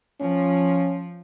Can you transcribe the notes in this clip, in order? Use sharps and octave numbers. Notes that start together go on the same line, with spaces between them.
F3 C#4